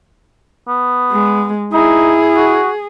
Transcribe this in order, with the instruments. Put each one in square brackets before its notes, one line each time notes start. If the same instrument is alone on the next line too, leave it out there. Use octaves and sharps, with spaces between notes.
[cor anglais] B3
[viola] G#3
[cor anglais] D#4 [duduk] E4 [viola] G#4
[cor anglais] F#4